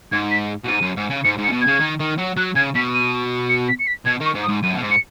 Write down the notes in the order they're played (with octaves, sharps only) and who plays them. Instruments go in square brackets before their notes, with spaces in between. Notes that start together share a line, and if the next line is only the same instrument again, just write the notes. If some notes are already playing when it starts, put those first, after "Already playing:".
[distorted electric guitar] G#2 [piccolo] G#6
[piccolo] B6
[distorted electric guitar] B2
[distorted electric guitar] G#2 [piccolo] D#7
[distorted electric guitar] F#2
G#2
C#3
[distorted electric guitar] G#2 [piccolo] C#7
[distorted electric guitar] G#2
[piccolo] C#7
[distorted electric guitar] C#3
B2
[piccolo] G#6
[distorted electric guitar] C#3
D#3
D#3
F#3
[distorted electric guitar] F#3 [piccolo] F#6
[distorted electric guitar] C#3 [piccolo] G#6
[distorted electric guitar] B2 [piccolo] B6
[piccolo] D#7
C#7
B6
C#7
B6
[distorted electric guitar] B2 [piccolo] G#6
[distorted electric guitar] D#3 [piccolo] C#6
[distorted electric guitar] G#2
[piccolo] D#6
[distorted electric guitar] G#2
[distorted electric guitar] F#2 [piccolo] D#7
[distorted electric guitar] B2
G#2
[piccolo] C#7